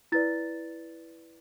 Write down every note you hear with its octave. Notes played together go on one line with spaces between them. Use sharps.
E4 B4 D5 A6